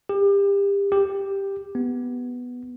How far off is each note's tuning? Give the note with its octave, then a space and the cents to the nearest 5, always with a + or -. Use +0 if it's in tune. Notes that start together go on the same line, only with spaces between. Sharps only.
G4 +30
G4 +5
B3 +0